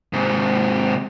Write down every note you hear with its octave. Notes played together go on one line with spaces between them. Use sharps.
G#2 C3